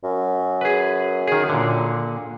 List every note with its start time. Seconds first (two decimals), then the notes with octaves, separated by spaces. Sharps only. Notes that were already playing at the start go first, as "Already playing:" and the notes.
0.04 F#2
0.61 G#4 B4
1.28 D#3 G#4
1.49 A#2 D3